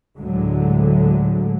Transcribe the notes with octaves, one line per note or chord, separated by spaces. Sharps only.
D2 A2 D3 F#3 G#3